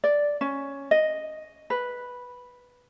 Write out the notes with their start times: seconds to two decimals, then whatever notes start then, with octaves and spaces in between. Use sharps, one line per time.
0.04 D5
0.41 C#4
0.91 D#5
1.70 B4